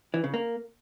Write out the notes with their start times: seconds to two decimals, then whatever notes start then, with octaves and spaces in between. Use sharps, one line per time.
0.14 E3
0.24 C#3
0.34 A#3